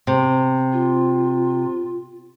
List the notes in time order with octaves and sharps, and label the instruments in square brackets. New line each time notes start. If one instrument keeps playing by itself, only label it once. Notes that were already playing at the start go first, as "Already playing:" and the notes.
[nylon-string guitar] C3
[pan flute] F4